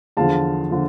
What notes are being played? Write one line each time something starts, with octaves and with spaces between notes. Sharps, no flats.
E2 D3 F3 F5 A5
D3 F3